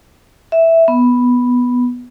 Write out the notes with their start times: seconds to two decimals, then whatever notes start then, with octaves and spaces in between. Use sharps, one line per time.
0.52 E5
0.88 B3